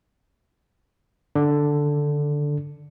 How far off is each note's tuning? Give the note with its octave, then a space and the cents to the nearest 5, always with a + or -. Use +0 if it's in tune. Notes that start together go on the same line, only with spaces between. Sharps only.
D3 +0 D4 +0